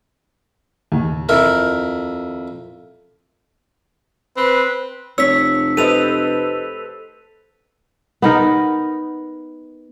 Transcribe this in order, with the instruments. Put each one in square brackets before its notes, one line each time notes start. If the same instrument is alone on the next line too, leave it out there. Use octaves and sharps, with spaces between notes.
[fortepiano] D#2
[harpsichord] F2 E4 A#4
[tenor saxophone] C4 [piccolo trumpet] B4
[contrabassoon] F1 [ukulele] C#5 [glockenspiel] E6 B6
[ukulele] G4 D#5 [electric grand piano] A4 B4 C5 [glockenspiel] D#7 F7
[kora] B3 D#4 A#4